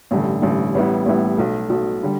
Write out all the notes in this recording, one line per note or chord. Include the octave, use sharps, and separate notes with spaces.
A1 G2 D3
A1 G2 D3
A1 A2 G3 B3 E4
A1 A2 G3 B3 E4
B1 B2 A3
B1 B2 A3
D3 G3